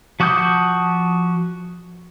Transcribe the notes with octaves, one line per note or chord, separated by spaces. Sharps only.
F3 F#4 D6 D#6 G6